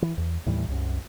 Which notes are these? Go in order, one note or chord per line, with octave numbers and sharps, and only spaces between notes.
E3
E2
D#2 A2 E3 G3
C2 F#2